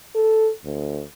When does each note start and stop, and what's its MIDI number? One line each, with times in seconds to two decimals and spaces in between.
0.15 0.50 69
0.64 1.03 38